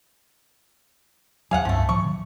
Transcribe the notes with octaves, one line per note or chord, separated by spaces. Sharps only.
E2 F#3 G#4 F5 F#5
C#2 G2 F3 A3 C4
A2 E3 F3 C#6
A#2 D#3 F#3